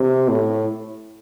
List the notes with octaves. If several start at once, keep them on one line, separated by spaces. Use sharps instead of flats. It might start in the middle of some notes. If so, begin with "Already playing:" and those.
Already playing: C3
A2